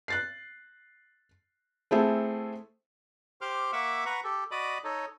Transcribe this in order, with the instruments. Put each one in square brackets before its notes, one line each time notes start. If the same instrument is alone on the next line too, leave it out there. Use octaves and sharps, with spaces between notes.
[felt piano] F#6 A6 C7
A3 C4 E4 G#4 A4
[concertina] G4 C5 C6 D6 F6
A#3 E5 F#5 C#6 D6 E6
B4 F#5 A#5 C#6
G4 A4
F#4 D5 D#5 B5 D6 D#6
D#4 A4 C#5 D#5